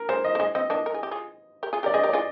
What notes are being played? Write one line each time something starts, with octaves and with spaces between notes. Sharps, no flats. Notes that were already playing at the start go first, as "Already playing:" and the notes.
Already playing: A#4
G#3 C5
D#5
A#3
G#3 D#5
C4 D#5
A#3 D4 D#5
A#4
G#4
G4
F4 G#4
G4 A#4
F4 G#4
G4 A#4 D5
G#4 C5 D#5
G4 A#4
D5
F4 G#4